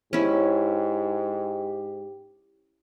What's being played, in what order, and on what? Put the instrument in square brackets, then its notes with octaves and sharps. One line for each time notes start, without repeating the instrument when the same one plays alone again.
[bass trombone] G#2 [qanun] C#4 E4 [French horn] G4